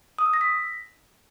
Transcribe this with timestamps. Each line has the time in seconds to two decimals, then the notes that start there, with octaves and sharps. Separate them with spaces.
0.19 D#6
0.26 E6
0.34 A#6
0.41 B6